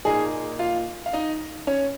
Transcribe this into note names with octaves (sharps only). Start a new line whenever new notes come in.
A#2 A#3 D#4 G#4 G#5
F4 F5
F5
D#4 D#5
C#4 C#5